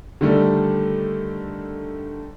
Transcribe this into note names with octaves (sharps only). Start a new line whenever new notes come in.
D3 D#3 G3 A3